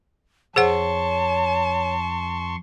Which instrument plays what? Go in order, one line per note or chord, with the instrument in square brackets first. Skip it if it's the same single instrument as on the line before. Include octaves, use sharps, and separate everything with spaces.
[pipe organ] F2 C6 C#6 [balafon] G#4 C5 F#5 [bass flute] C#5 [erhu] A5